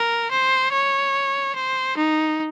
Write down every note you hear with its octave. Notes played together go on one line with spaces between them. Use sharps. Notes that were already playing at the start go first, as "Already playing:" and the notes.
Already playing: A#4
C5
C#5
C5
D#4